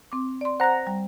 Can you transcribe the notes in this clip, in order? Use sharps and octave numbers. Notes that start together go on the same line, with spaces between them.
C4 D6
D5 C6
C5 F#5 A#5 F#6
G3